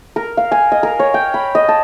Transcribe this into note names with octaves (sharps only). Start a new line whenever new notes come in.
A#4
F5
G#5
D#5
A#4
C#5
G5
B5
D#5
A5